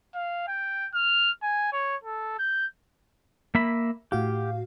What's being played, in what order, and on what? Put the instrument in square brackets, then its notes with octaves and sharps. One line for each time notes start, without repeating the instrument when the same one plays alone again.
[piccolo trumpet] F5
G5
F6
G#5
C#5
A4
G6
[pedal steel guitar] A#3 E5 B5
[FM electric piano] A2 F#4 F5 [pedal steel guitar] G4